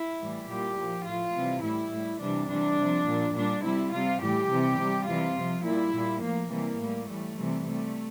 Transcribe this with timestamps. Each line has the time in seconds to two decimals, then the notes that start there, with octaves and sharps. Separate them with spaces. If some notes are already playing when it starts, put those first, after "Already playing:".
Already playing: E4
0.20 A2 E3 G3
0.49 A#2 G3 G4
0.78 A#2 F3
1.06 A2 F3 F4
1.35 C3 E3 G3
1.63 A2 G3 E4
1.92 A2 G3
2.21 C3 E3 G3 D4
2.49 C3 E3 G3 D4
2.78 C3 F3
3.06 A#2 F3
3.35 A#2 G3 D4
3.64 C3 G3 E4
3.93 C3 G3 F4
4.22 A2 E3 G3 G4
4.50 C3 E3 G3
4.79 C3 G3
5.07 C3 E3 G3 F4
5.36 C3 F3
5.65 A#2 G3 E4
5.94 A#2 G3
6.22 A2 F3 A#3
6.51 C3 E3 G3 A#3
6.79 A2 G3
7.08 A2 E3 G3 A3
7.36 C3 E3 G3
7.65 C3 G3 A3